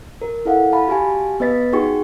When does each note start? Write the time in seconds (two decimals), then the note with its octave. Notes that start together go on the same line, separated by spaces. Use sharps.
0.21 A#4
0.45 E4 A4 F5 F#5
0.72 F5 A5 B5
0.88 F#4 G4 F5 G#5 A5
1.40 B3 B4 D#5 A6 B6
1.73 D#4 F#4 G#4 G5 C#6